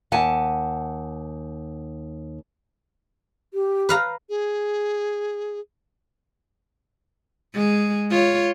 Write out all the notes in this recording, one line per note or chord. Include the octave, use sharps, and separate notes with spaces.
D#2 F#5 G#5 A5
G4
B4 F5 A#5
G#4
G#3 G#4
F4 C#5